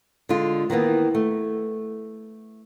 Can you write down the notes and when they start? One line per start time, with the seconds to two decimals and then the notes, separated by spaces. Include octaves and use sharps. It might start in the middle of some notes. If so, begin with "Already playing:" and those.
0.29 D3 G#3 F4
0.70 D#3 E3 A#3 B3
1.15 A3